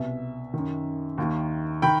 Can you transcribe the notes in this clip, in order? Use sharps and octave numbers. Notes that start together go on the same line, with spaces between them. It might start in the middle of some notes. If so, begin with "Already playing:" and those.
Already playing: C2 B2 E5
F#2 D#3
D#2 D#3
D#3 G5 B5